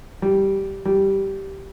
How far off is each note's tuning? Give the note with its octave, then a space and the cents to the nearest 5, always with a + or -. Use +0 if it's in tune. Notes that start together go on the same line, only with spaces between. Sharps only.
G3 -5
G3 -5